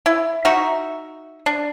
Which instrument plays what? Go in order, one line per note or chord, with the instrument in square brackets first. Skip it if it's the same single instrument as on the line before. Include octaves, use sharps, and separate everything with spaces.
[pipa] E4
D#4 F#4 E5
D4